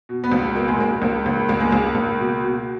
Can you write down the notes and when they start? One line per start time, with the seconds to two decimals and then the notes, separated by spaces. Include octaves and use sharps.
0.09 B2
0.24 B3
0.32 C#2
0.55 B2 A#3
0.68 G#3
0.79 C#2 A#3
1.02 C#2 A#3
1.26 C#2
1.49 C#2 A#3
1.60 G#3
1.71 C#2 A#3
1.95 C#2
2.19 B2
2.42 B2